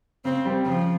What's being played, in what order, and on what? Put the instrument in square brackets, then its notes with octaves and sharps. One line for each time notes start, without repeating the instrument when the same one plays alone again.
[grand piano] C#3 [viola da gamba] C4
[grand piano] G3 C4
[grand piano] C#3 [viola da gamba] F3